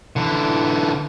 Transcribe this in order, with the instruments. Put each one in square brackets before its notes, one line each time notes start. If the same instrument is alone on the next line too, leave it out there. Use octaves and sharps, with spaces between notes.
[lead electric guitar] D3 E3